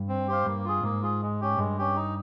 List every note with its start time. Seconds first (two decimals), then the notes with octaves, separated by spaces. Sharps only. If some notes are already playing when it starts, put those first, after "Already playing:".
Already playing: G2
0.09 C4
0.28 G4 C5 F5
0.46 G2 A#3
0.65 F4 G#4
0.83 G#2 A#3
1.02 F4 G#4
1.22 G#3
1.41 C#4 G4
1.58 G2 G#3
1.78 C#4 G4
1.96 D#4